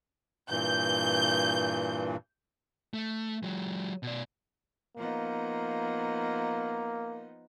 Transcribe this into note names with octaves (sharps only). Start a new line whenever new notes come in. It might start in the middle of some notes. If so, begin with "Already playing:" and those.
G2 A#2 E3 G6
A3
F#3 G#3
B2 D5
F3 A#3 B3 D#4